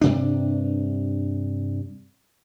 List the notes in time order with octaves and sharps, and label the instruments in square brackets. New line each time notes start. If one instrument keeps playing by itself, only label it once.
[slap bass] G2 C3 D4